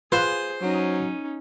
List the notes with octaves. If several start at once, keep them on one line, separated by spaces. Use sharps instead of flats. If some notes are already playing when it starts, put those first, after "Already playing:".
F4 G#4 B4 C5
F#3 C#4 D#4